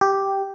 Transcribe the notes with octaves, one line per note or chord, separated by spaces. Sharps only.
G4